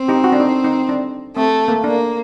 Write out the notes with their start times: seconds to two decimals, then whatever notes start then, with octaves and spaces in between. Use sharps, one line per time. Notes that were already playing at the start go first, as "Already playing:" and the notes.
Already playing: C4
0.08 D#4 G4
0.24 F#4
0.32 D4
0.40 D#4
0.64 D#4
0.89 D4
1.36 A3 C4
1.68 A#3
1.84 A#3 D4